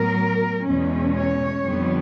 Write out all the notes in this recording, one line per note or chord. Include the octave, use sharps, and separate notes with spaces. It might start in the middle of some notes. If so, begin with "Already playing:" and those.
Already playing: A2 F#3 B3 A#4
E2 B2 G#3 C#4
C#5
F2 D3 G3 B3